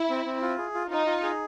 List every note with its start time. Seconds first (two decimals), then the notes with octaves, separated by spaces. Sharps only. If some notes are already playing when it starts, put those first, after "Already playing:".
Already playing: E4
0.09 C4
0.25 C4
0.42 F4
0.58 G#4
0.74 F4
0.90 D#4 F4
1.06 F4
1.23 G#4